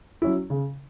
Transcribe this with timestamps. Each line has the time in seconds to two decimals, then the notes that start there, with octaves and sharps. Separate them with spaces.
0.22 F#3 C#4 E4
0.50 C#3